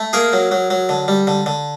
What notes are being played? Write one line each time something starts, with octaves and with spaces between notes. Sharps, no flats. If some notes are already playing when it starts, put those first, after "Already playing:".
Already playing: A3
A#3 G#4 A#4
F#3
F#3
F#3
D3
G3
D3
D3